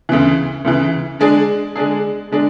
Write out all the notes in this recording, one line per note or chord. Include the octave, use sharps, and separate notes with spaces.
D2 C#3 E3
D2 C#3 E3
D3 G#3 D4 G#4
D3 G#3 D4 G#4
D3 G#3 D4